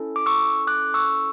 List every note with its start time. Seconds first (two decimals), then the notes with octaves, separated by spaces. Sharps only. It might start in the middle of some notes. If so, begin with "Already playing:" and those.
Already playing: C#4 E4 A4
0.16 D6
0.26 C#6 E6
0.67 D6 F#6
0.94 C#6 E6